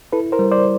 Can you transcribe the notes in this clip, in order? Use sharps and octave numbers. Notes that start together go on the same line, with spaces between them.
E4 A4 B4
A#4 C5
G3
C5 D5